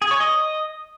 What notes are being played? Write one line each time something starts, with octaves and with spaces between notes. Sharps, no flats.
G#4
C#5
D#5